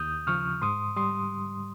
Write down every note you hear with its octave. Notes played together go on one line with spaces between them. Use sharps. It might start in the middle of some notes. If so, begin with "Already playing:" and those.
Already playing: D#2 D#6 G6
C#3 F3 C#6 F6
G#2 C6 D#6
G3 C6 D#6